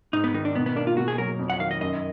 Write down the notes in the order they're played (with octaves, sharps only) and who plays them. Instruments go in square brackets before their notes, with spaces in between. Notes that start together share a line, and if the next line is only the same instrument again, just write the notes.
[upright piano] G#2 [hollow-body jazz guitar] D#4
[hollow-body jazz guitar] B3
[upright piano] D#3 [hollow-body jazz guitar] D#4
[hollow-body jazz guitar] D4
[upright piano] B2 [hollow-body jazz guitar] B3
[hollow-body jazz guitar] B3
[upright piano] A#3 [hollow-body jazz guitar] D4
[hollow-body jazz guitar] F4
[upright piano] B2 [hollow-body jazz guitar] F#4
[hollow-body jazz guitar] G#4
[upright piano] F#3 [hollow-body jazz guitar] A#4
[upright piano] F2
[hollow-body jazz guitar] F#5
[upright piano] D#3 [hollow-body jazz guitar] F5
[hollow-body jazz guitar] D#5
[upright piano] F#2 [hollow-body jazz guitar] D#5